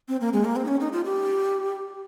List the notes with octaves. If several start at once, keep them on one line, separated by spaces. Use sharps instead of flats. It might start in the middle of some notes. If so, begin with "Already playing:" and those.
C4
A#3
G#3
A#3
C4
D#4
C#4
D#4
F4
G4